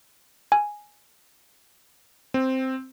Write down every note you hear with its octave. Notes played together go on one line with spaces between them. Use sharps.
G#5
C4